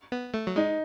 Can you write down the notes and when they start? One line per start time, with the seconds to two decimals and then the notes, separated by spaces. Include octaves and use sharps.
0.12 B3
0.34 A3
0.47 F#3
0.56 G#3 D#4